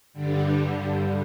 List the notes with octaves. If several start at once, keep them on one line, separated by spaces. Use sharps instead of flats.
G2 D3 G3